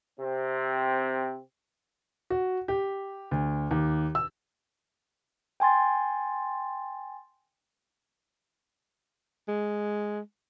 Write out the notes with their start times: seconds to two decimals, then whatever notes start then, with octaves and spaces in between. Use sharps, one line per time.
0.20 C3 C4
2.30 F#4
2.68 G4
3.31 D2
3.71 D#2
4.15 E6
5.60 G5 G#5 C6 A6
9.48 G#3